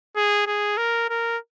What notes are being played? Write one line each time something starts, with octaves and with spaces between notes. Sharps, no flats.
G#4
G#4
A#4
A#4